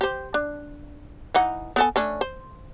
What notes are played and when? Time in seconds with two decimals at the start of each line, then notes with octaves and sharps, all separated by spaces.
0.01 G4 C5
0.34 D4
1.34 E3 D#4 F#5
1.76 B3 A4 G#5
1.96 A3 C#4 D4
2.21 C5